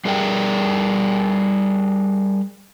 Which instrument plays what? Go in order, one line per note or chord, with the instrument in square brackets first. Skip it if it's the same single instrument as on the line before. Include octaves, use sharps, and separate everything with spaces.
[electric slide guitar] G3 G#4 A#4 D5 G5